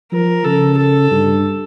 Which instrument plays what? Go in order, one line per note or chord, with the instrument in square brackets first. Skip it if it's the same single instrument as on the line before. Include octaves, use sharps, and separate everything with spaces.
[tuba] F3 [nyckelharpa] A#4
[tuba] C#3 [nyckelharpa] A4
[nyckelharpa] A4
[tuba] G2